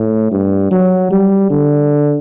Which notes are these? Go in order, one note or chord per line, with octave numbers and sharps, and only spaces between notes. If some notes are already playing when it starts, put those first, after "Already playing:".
Already playing: A2
G2
F#3
G3
D3